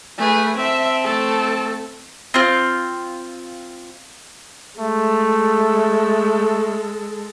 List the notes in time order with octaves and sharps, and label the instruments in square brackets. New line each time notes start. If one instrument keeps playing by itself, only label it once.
[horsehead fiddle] A3 B4 [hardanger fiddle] G#4
[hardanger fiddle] C4 A5 [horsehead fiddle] E5
[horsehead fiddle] A3 A4
[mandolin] C4 F4
[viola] G#3 A4 [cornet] A3